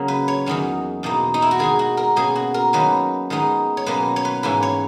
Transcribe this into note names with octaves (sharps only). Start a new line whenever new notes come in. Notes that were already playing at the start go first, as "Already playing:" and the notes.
Already playing: C#3 F#3 A#3
B4
C#5
E2 D#3 F#3 C#4
E2 B2 A#3 D#4
D#4
E4
F#4
D#3 G#3 D#4 G#4
F#4
A#4
B2 A#3 C#4 G#4
F#4
A#4
D#3 F#3 A#3 C#4 B4
D#3 G#3 B3 D#4
C#5
B2 F#3 A#3 C#4 B4
C#5
B4
G#2 E3 A#3 C#4 B4
C#5